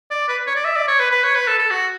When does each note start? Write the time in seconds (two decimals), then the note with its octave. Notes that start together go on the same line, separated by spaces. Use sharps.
0.11 D5
0.29 B4
0.47 C#5
0.55 D5
0.65 E5
0.76 D5
0.88 C#5
1.00 B4
1.11 B4
1.24 C#5
1.35 B4
1.47 A4
1.59 A4
1.71 F#4